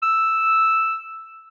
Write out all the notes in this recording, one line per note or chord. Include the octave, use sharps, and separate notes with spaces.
E6